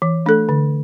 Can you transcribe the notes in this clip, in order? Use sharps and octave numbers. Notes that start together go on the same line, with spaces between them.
E3
A3 D4 A4
D3